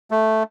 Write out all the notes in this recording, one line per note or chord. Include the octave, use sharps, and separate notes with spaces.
A3